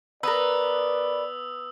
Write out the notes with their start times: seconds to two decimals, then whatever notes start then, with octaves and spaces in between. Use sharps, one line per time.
0.23 B3 A#4 B4 D5 D#6 E6